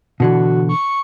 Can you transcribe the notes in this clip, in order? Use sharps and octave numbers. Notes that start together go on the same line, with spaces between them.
B2 D3 E3 F#4
C#6